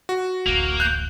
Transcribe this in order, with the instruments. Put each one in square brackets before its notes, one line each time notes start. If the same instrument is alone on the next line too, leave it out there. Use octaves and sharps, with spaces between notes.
[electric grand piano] F#4
[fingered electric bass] D1 A1 [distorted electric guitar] A#3
[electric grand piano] F#6 G6